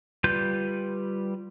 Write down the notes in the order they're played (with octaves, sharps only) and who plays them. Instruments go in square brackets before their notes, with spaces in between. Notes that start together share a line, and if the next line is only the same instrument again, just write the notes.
[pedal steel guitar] G3 F4 B4 G6